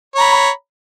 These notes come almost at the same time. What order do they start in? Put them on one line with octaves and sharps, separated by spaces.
C#5 A#5 B5